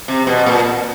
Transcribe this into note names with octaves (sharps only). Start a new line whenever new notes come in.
C3
B2
A#2